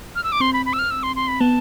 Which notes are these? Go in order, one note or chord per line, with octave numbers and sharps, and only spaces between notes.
F6
E6
D6
C4 C6
B5
B5
E6
F6
E6
C6
C6
B5
B3 A5